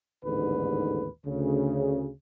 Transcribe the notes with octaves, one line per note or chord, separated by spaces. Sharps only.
A1 D#2 G#2 D3 B4
D2 C#3